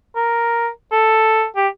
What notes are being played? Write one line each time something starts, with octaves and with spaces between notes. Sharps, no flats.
A#4
A4
G4